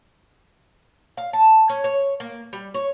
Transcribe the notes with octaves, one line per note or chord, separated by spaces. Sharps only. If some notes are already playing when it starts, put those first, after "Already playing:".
F5
A5
C#4
C#5
A#3
G3
C#5